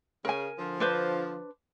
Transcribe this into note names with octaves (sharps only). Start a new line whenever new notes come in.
C#3 A#4 G#5
D3 F3
D4 B4 C5